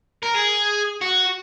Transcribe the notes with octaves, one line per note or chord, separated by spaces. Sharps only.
A#4
G#4
F#4